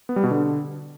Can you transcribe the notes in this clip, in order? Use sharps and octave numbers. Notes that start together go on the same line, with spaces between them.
B3
G3
B2
D3